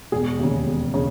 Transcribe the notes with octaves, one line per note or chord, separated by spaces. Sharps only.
E1 G#4
D#2 C#3
E1
C#3